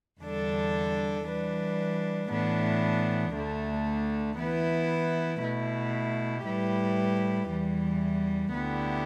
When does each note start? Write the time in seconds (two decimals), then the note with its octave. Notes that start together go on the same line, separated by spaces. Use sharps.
0.21 E2 D3 G3 D4 A4
1.26 E3 G3 D4 B4
2.29 A2 E3 B3 D4
3.33 D2 D3 A3
4.38 E3 B3 E4 B4
5.41 B2 A3 E4
6.45 A2 G3 E4 G4 B4
7.49 E2 E3 G3
8.53 D2 D3 B3 E4 G4